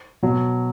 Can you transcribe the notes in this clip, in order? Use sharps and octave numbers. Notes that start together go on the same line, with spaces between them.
B2 F#3